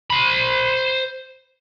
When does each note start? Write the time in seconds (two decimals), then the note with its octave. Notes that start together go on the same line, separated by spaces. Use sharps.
0.10 C5 B5